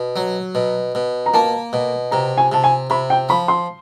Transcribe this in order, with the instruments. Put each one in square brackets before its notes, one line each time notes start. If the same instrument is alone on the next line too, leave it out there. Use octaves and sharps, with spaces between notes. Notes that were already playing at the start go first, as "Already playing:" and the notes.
Already playing: [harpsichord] B2
F#3
B2
B2
[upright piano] A#5
[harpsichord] A#3 [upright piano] A5
[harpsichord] B2
[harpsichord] C3 [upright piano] A#5
[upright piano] G#5
[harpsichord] C3 [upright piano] A5
[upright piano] G#5
[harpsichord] C3 [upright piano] B5
[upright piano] G5
[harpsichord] F3 [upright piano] B5
[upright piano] C6